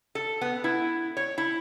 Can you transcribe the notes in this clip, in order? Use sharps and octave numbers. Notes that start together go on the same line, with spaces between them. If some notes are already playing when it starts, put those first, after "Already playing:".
A4
B3
E4
C#5
E4